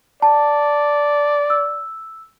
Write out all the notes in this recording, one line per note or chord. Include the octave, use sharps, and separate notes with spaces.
D5 A5
E6